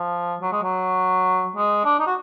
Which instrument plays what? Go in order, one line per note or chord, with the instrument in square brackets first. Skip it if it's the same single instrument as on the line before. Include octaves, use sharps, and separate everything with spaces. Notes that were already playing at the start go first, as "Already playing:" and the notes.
Already playing: [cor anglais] F3
F#3
G#3
F#3
G#3
D4
D#4
F#4